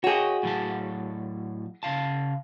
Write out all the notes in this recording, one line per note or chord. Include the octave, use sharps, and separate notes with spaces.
F#4 G#4 C#5 D#5
A2 F#3 A5
C#3 F5 A5